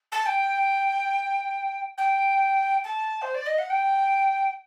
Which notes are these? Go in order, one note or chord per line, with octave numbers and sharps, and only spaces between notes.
A5
G5
G5
A5
C5
D5
D#5
F#5
G5